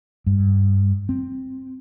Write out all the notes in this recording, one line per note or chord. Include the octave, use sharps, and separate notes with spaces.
G2
C4